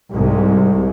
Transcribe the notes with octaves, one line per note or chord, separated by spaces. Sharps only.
C2 G#2 C3